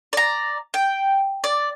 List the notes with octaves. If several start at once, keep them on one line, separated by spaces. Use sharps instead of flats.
D5 A#5
G5
D5